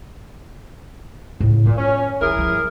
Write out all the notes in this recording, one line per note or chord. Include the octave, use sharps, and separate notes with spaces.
A2 C#3
A#2 F4
C#4
E3 E4 G#4 A#4
G2 F3